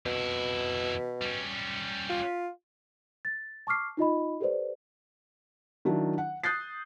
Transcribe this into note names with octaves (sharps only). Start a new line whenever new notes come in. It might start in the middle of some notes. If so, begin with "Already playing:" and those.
F2 B2 E4
G3 C#4
F4
A6
A5 C#6 D6 F6 C7
D#4 F4 D#5 B5
G4 A4 B4 C5 D5
D#3 F#3 D4 E4
F#5
D#6 F#6 G6 A6 C7